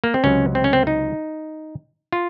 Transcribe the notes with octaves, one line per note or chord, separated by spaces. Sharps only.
A#3
C4
C#2 C3 F#3 C#4
C4
C#4
C4
D#4
F4